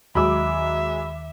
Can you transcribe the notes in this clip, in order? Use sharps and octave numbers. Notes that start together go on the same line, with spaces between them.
D#2 F#3 G#3 E5 B5 D6 E6